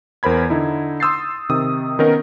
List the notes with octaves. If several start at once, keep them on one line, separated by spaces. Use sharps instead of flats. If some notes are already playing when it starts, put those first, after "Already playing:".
E2 A#4 C5 B5 G#6
D3 D#4 E4
C6 D#6 E6 G6 A6 C7
C3 D#3 D#6
D#3 B3 C#4 D#4 A#4